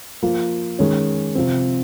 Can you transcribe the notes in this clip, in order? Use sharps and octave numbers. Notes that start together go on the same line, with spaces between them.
F3 A#3 F4
D#3 G#3 C#4
C3 F3 C4